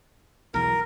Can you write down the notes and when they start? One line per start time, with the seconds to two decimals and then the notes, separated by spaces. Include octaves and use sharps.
0.54 B1 E2 A#4